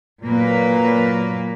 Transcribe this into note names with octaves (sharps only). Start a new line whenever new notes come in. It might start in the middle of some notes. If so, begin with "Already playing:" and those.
A#2 F#3 A#3 B4